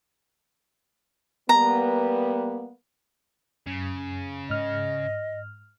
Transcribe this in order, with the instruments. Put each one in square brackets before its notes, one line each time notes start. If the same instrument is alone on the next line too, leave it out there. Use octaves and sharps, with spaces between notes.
[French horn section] G3 A#3 B3 [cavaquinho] A#5
[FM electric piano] F#2 [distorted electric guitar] C#3
[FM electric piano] G#2 F6 [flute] D#5